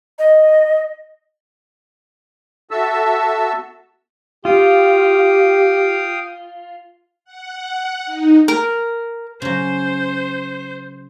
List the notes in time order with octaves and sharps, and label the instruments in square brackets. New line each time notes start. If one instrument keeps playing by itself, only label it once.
[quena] D#5
[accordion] F#4 A4 E5 A5 E6
[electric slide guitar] F4 [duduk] G4 [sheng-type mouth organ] F5 G5 D#6
[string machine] F#5
D#4
[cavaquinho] A#4
[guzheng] C#3 F#3 [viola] C5